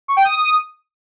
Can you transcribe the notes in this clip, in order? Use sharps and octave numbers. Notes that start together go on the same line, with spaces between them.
C#6
G5
D#6